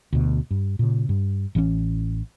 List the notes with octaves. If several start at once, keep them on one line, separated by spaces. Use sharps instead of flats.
D2 B2
G2
A#2 C#3
G2
A1 E3 F3 C#4